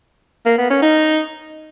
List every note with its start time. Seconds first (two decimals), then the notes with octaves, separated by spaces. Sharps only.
0.46 A#3
0.58 B3
0.70 C#4
0.82 D#4